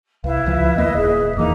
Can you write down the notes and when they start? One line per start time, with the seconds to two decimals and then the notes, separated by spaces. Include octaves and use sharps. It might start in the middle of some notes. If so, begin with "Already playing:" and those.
0.24 C2 E4 B4 F5
0.46 C#2 F3
0.76 D#2 A#3 D#5
0.97 D#1 G#4 E5
1.37 E2 E3 A#3 D#4 A#5 D6